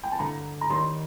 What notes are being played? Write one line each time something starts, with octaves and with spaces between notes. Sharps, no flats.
G5
A5
G2 D3 A3 A#5
A#5
D#2 D#3 G3 C6